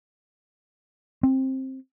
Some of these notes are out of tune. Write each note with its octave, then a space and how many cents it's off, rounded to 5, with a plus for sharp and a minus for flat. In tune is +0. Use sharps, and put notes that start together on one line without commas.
C4 +15